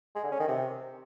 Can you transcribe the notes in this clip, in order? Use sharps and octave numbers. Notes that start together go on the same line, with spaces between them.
G#3
D3
C#4
D#3
C3